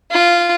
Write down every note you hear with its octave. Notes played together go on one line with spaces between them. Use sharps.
F4